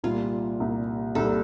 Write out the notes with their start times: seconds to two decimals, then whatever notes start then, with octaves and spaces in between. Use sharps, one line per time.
0.04 C2 A#2 G3 F4
0.60 C2 A#2 G3
1.15 C2 A#2 G3 A4